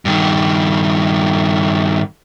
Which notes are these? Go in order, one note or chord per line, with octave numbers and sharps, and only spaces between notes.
G2 D#3